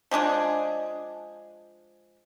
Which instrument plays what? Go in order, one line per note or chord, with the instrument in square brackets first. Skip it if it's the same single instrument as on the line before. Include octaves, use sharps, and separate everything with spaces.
[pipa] F3 G#3 D4 G#4